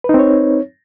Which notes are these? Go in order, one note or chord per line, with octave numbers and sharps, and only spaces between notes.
C4 D#4 B4 C#5